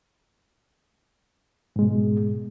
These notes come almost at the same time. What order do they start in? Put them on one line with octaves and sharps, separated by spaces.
G#2 G#3 B2